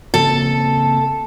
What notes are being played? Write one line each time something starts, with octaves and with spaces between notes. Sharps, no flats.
C#3 A#3 C4 A4